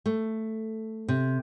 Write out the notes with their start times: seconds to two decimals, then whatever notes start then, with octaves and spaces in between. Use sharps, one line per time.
0.06 A3
1.08 C3